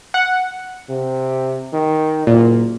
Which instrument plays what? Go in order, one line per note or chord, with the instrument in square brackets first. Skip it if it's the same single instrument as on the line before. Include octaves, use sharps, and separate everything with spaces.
[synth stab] F#5
[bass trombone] C3
D#3
[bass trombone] F#1 [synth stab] A#2